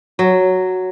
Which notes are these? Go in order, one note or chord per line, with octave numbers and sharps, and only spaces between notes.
F#3